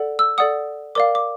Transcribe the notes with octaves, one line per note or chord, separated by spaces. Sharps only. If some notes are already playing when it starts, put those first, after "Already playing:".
Already playing: A4 D5 F#5
E6
A4 D5 F#5 D#6
A#4 D5 F5 D6
D6